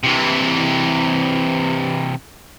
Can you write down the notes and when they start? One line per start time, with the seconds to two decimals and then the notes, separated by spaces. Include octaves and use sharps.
0.04 C3 E3